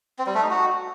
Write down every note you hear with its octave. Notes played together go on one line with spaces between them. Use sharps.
C4
G3
A3
D#4
F#4